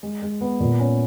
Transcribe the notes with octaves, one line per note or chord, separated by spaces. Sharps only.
G#3
G#3
B3
A#2
C#4